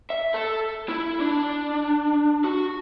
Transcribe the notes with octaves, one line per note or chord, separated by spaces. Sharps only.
E5
A4
E4
D4
F#4